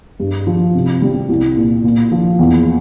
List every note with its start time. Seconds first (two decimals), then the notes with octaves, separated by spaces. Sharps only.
0.20 G2
0.47 F3
0.75 C3
1.02 G3
1.29 C2
1.57 A#2
1.84 A#2
2.11 F3
2.39 E2